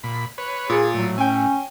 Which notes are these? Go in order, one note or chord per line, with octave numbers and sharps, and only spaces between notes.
A#2 B5
B4 C#5
A#2 G#4
A2 F#3
C#4 G5 G#5